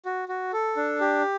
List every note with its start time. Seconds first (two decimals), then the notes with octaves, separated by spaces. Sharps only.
0.05 F#4
0.29 F#4
0.53 A4
0.77 D4
1.00 G4